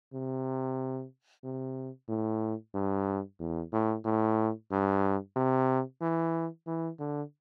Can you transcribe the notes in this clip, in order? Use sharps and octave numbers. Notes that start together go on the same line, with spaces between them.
C3
C3
A2
G2
E2
A2
A2
G2
C3
E3
E3
D3